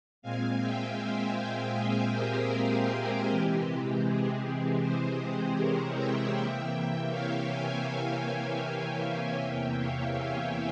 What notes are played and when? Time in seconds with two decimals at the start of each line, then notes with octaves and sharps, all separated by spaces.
0.22 A#2 G#3 C4 F5 G#5
0.60 E5 G5
0.99 C5 E5
1.75 G#4 C5
2.13 G4 A#4
2.51 G#4
3.28 C3 E3 G#3 C4 G4
4.04 G#4
4.81 G#4 C5
5.57 A#4 C#5
5.95 E5 G5
6.33 C3 E3 A#3 E5 G5
7.10 C#5 F5
7.49 F5 G#5
7.87 E5 G5
8.24 C#5 F5
8.63 E5 G5
9.39 E2 C3 E3 A#3 E5 G5
9.78 C#5 F5
10.16 F5 G#5